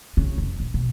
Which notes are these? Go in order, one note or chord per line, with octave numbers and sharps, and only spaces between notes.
C#3
F1
A#2
B2